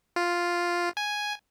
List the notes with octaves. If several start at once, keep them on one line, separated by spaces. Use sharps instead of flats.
F4
G#5